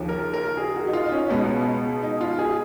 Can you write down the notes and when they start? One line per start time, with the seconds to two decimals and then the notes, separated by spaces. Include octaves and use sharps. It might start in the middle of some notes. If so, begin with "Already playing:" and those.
Already playing: D#2 C#3 F3
0.09 A#4
0.33 A#4
0.57 G#4
0.76 F#4
0.87 D#4
0.93 F4
1.05 D#4
1.12 C#4
1.30 C#2 B2 G#3 B3
2.02 D#4
2.21 F4
2.39 G#4